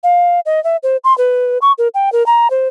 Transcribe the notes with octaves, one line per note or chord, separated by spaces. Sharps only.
F5
D#5
E5
C5
C6
B4
C#6
A#4
G5
A#4
A#5
C5